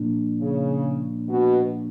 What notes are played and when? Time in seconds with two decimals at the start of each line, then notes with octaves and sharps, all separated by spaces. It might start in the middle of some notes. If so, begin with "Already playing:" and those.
Already playing: A#2 F3 A#3 D4
0.41 C#3
1.29 B2